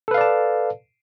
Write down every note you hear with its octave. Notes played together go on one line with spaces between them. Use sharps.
A4 B4 D5 F5 A5